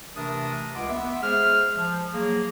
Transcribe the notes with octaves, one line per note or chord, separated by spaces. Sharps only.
C3 E3 A3 D4 A#4 D#6
C#2 G#3 F#5 C6 D6
B3 E5
G#3 G#4 C5 F6
F3
F#3 A#3 G#4